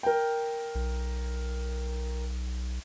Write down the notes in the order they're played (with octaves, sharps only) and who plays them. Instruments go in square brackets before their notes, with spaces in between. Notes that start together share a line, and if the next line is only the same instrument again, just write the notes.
[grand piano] A#4 G5
[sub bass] B1